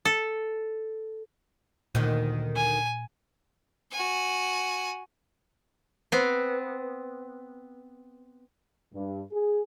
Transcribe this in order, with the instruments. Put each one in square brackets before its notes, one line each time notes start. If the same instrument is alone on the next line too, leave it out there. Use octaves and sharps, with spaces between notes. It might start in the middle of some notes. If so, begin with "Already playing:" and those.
[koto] A4
[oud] D2 D#3 [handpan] A#2
[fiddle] G#5
F#4 G#5
[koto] B3 C4
[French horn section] G2
G#4